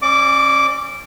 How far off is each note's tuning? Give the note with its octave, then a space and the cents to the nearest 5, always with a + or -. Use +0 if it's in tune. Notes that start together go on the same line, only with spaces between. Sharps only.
C#4 -30 D5 +30 D6 -15